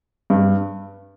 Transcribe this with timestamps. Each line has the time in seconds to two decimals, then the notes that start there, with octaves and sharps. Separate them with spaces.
0.30 G2